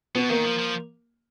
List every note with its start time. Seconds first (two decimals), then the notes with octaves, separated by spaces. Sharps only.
0.15 B2 B3
0.29 D#3 A#3
0.44 F3
0.59 F3